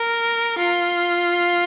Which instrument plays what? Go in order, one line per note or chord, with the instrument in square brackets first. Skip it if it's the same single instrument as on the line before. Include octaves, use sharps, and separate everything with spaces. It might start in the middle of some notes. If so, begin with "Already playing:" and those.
Already playing: [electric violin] A#4
F4